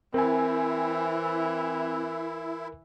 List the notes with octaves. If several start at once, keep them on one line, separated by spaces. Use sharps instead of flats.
E3 C4 E4 A#4 G#5